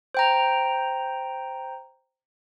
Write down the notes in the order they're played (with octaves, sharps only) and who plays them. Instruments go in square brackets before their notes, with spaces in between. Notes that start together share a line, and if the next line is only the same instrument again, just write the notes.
[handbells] C5 G5 A#5